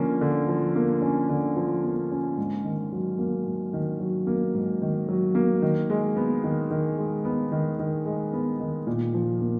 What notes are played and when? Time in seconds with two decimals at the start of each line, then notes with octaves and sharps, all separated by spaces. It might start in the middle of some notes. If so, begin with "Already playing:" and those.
Already playing: D3 F3 A#3 C#4
0.21 D3
0.48 F3
0.76 A#3
1.02 C#4
1.29 D3
1.56 F3
1.84 A#3
2.11 C#4
2.37 G#2
2.64 D#3
2.92 F#3
3.18 A#3
3.46 G#2
3.73 D#3
4.00 F#3
4.27 A#3
4.54 G#2
4.82 D#3
5.08 F#3
5.35 A#3
5.62 D#3
5.90 G#3
6.16 B3
6.44 D#3
6.71 D#3
6.98 G#3
7.25 B3
7.52 D#3
7.79 D#3
8.06 G#3
8.33 B3
8.60 D#3
8.87 A#2
9.14 F3
9.41 A#3